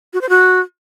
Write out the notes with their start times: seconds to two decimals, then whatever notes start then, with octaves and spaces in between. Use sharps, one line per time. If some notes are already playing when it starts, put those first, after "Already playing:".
0.13 F#4
0.21 C5
0.29 F#4